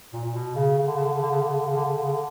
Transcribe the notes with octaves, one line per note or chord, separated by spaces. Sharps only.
A#2
A#2
B2
C#3
C#3
D3
C#3
D3
C#3
D3
C#3
D3
C#3
D3
C#3
D3
C#3
D3
C#3
D3